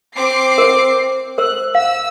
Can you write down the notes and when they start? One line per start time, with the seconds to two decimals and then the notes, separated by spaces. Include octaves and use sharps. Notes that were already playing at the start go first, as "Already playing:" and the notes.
0.14 C4 D6 C7
0.58 A#4 C5
1.38 A#4 C5 E6 F#6
1.75 F5 E6